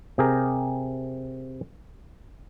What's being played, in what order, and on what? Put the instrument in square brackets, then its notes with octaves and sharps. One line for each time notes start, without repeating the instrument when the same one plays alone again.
[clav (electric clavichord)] C3 G4 G#4 A#4 A#5